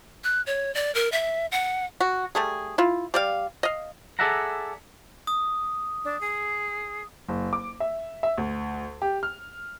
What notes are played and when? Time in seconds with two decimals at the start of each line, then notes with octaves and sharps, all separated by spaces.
0.24 F#6
0.47 C#5
0.75 D5
0.95 A#4
1.12 E5
1.52 F#5
2.00 F#4
2.35 G3 A3 G#4
2.78 E4 F4
3.14 G3 D5 F5
3.63 D#5 F5
4.19 G#4 A4 D5 E5 F#5 A#5
5.27 D#6
6.05 D4
6.21 G#4
7.28 F#1
7.53 D6
7.80 E5
8.23 E5
8.38 D2
9.02 G4
9.23 F6